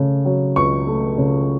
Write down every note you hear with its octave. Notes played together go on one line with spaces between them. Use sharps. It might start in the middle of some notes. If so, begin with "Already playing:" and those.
Already playing: C#3 A3
F#3
C#2 C#6
A3
C#3